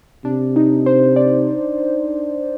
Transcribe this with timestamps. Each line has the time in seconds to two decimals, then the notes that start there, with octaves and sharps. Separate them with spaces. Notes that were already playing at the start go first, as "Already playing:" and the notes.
0.25 C3 D4
0.56 D#4
0.86 C5
1.16 D5